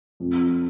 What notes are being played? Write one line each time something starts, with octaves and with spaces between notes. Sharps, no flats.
F2